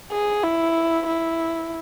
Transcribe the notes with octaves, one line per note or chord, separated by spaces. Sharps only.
G#4
E4
E4